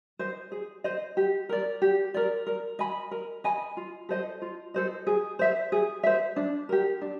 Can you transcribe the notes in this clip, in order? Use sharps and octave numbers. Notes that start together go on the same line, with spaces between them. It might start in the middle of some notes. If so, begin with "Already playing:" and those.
C5 D#5
G#4
C5 D#5
G4
A#4 D5
G4
A#4 D5
A#4
D#5 G#5 B5
A#4
D#5 G#5 B5
F4
A4 C5 D#5
F4
A4 C5 D#5
G#4
C5 E5
G#4
C5 E5
D4
G4 A#4
D4